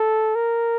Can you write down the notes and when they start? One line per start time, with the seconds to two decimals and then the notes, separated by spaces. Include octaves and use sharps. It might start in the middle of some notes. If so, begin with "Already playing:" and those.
Already playing: A4
0.35 A#4